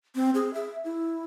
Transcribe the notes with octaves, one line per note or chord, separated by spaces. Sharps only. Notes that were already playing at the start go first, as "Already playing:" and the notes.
C4
G#4
E5
E4